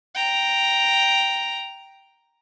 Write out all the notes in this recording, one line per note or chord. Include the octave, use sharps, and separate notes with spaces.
G5 A#5